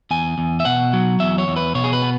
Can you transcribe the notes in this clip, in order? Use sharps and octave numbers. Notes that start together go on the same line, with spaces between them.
E2 G#5
E2
E5
B2 F#5
F#3
E2 E5
C#5
E2
B4
B2 C#5
G#4
B4
B3